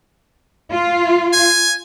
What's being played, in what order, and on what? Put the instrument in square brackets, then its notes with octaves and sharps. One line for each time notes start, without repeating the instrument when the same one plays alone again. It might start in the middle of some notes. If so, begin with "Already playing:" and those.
[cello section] F4
[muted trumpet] G#5